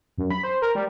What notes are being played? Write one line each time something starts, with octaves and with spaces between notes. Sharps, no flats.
F#2
B5
C5
A#4
G3